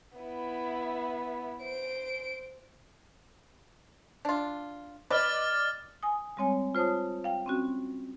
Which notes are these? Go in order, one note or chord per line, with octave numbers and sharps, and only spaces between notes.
B3 E4
C5 D7
D4 F4
B4 D5 D#5 D6 F6 A6
G#5 D#6
G3 G#3 C4 C#5 G#5
F4 C5 C#5 A5 D#6
F5 G5
C4 C#4 F#4